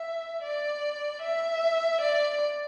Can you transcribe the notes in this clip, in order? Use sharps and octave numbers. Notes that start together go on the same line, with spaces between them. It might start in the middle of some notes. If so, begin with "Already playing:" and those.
Already playing: E5
D5
E5
D5